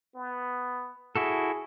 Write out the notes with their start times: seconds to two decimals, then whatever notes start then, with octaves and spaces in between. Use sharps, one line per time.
0.15 B3
1.16 E4 F#4 G#4 A4